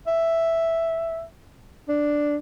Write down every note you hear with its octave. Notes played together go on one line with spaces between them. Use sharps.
E5
D4